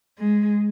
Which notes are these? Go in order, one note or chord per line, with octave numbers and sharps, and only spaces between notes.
G#3